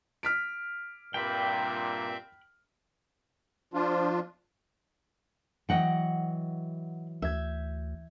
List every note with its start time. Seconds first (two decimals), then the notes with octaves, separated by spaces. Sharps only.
0.23 F6 B6 D7
1.14 G2 A#2 C4 E5 G5 B5 G6
3.74 F3 D4 F4
5.69 E3 F#3 D#5 F#5 G5
7.22 D2 E5 G6 G#6